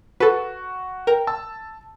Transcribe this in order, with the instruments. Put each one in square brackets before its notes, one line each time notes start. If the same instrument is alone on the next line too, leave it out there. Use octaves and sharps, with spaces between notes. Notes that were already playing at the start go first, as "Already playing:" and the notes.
[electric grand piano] F#4 [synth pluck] A4 B4
[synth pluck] A#4 [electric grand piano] G5
[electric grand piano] A5 E6